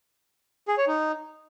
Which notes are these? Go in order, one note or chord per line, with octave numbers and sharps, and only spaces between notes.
G#4
C#5
D#4